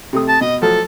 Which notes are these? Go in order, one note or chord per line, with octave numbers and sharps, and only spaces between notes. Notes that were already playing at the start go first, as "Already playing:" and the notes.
C3 A3 D#6
A5
B2 D#5
F3 F#3 A3 A4